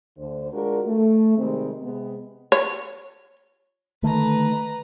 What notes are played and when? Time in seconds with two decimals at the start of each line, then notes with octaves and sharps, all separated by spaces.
0.18 D2 D3 C5
0.52 G#3 D4 F4 F#4 A#4
0.86 A3
1.38 C3 D#3 G3 G#3 C4
1.83 C3 G#3 B3
2.52 C#5
4.03 D3 D#3 A3 B4 A#5